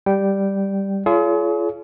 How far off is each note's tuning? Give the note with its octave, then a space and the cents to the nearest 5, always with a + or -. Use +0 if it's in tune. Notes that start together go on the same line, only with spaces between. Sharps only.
G3 +0 G5 -10
F4 -30 G#4 +40 C#5 +40